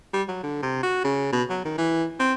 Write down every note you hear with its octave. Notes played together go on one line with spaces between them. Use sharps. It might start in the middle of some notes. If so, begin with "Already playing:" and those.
G3
F#3
D3
C3
F#4
C#3
B2
F#3
D#3
E3
C4